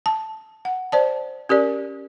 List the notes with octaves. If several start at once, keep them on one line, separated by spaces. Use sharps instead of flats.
A5
F#5
C5 D5 A5
C#4 G4 A#4 D5